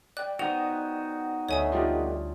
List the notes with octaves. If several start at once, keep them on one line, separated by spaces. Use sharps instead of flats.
D5 G5 F#6
B3 D#4 F#4 C5 F7
D2 C#5 D#5 E5 G#5 D#6
G3 D4 F4 G4 A4 D#5